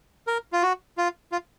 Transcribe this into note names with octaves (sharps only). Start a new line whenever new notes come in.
A#4
F4
F#4
F4
F4